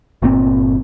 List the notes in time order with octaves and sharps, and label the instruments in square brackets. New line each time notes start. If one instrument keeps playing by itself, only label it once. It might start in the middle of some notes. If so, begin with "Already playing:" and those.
[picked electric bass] G1 A#2 C4